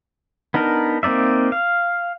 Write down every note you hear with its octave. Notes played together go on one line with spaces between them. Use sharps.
B3 D4 D#4 A#4
A#3 C4 D#4 D5 E5
F5